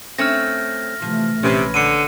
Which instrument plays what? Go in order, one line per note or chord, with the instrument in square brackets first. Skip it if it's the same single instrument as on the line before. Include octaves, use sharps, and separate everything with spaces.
[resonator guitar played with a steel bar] A3 C4 C#4 [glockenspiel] F6 A#6
[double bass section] C3 E3 A3 [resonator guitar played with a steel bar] F3
[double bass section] A#1 [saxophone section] C3 [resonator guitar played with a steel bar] C#4 B4
[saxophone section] D3 [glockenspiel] C#7 D#7